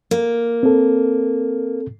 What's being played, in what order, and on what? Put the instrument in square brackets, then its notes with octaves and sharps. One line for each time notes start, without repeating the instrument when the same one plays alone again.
[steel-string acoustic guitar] A#3
[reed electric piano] C4 A4